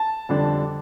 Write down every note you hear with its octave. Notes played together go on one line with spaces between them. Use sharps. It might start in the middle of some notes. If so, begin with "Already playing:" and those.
Already playing: A5
F2 D3 G3 D4